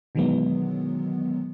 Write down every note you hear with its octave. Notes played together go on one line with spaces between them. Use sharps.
B2 D#3 E3 F#3 G#3 B3